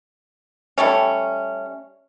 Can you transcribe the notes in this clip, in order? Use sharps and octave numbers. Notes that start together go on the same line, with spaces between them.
G3 A3 C#4